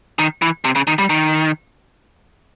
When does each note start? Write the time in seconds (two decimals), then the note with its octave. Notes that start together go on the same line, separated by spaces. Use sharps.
0.19 D#3
0.42 E3
0.65 C3
0.76 C#3
0.87 D#3
0.99 G3
1.10 D#3